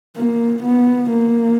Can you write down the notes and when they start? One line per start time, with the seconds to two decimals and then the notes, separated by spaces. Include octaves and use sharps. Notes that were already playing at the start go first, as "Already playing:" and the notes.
0.17 A#3
0.63 B3
1.10 A#3